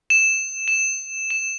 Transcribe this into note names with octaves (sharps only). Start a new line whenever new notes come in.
E7
E7
E7